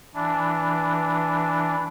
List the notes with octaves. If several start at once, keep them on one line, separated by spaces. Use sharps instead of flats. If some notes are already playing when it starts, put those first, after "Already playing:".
E3 D4